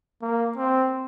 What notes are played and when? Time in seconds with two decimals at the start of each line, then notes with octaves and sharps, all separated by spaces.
0.22 A#3
0.57 C4